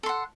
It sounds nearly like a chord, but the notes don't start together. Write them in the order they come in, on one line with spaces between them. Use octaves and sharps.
A4 C6 F#5